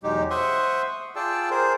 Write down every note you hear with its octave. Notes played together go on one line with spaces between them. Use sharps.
E2 B2 F#3 G#3 D#4 G4
C5 E5 F#5 C6 C#6 D#6
F4 G#4 D5 G5 A5 E6
G#4 A#4 C5